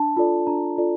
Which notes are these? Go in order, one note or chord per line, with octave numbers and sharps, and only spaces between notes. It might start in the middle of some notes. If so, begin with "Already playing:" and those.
Already playing: D4 A5
F4 A4 D5
D4 A#5
F4 A4 D5